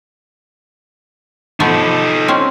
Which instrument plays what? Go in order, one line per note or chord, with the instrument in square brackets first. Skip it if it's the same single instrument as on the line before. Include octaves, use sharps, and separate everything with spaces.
[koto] F3 A3 B3 [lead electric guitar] D#4 A4
[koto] C4 C#4